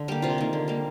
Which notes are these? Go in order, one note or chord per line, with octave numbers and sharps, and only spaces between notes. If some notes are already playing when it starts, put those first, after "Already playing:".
Already playing: D3
G3 A#3 G4
C3 F4
D#3 A#3
D3
G3 A#3